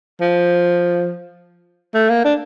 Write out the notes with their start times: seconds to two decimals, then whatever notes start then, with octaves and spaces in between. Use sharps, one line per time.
0.21 F3
1.95 A3
2.09 A#3
2.25 D4